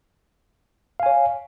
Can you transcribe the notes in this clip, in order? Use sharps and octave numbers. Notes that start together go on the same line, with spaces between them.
C#5 F5 G#5